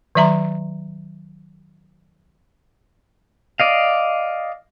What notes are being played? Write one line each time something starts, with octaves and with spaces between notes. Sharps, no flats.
D#3 F#3 E5 A#5 C6
D5 D#5 F5